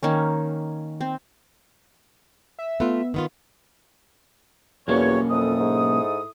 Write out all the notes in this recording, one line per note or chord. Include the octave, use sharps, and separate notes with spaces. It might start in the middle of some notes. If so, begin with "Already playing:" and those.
D#3 A#3 C#4
C4
E5
A3 B3 F4
D#3 B3 F4
B1 E2 G3 A#3 C#4 F#4 C#5
F2 E4 A4 D#6
G#2